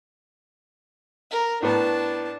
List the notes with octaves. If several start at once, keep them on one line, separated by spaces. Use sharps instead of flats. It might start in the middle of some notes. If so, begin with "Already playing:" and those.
A#4
A2 B3 D4 A5